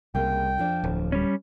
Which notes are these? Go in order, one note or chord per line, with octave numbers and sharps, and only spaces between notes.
C2 C#3 G#3 A#3 G5
F2 F3 D4
D1
G3 C#4